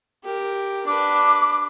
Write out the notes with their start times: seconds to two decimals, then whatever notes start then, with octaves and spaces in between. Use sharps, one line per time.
0.24 G4 A#4
0.87 D4 B4 D6